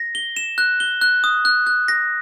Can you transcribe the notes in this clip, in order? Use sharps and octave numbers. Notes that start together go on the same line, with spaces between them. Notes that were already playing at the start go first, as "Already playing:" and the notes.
Already playing: A#6
G7
E7
F#6
G7
F#6
D#6
F#6
F#6
A#6